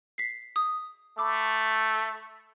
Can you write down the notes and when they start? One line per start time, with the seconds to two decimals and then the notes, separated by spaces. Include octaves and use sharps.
0.18 B6 C7
0.56 D#6
1.18 A3 B5 D6 E6